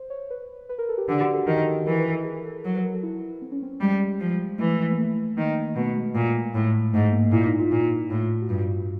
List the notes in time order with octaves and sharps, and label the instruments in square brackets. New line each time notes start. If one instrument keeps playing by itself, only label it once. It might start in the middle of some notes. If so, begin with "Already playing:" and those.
Already playing: [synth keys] C5
C#5
B4
B4
A#4
A4
G4
[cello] D3 [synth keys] G4
[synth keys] F#4
A4
[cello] D#3 [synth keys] A#4
[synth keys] A4
[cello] E3 [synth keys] A#4
[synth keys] B4
A4
G#4
A4
[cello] F#3 [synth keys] A#4
[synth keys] B4
A#4
A4
E4
C4
C#4
C4
[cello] G3 [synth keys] G#3
[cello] F3
[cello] E3 [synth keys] A3
[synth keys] A#3
A3
[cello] D#3 [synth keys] A#3
[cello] B2 [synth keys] A3
[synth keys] G#3
[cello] A#2
A2
[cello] G#2 [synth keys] A3
[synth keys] A#3
[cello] A#2 [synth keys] E4
[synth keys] D#4
F4
[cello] A#2
A2
[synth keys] F#4
[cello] G2 [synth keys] F4